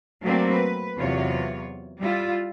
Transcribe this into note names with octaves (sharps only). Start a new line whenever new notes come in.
F#3 A3 A#3 C4 D4
B4
E2 C3 F#3 F4 C#5
G3 E4 F4